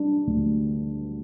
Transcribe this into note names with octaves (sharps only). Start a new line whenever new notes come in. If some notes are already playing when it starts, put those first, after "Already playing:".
Already playing: G3 D4
D2